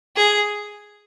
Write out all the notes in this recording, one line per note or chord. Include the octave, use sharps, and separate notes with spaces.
G#4